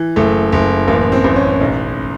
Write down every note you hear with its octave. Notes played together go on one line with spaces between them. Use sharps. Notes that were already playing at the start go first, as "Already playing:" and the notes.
Already playing: E3
F#1 A3
F#1
A1 A#3
C4
A1
C#4
B1